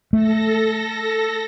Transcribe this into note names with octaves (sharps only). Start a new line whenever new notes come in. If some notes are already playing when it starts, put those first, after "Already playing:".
A3 A4 A#6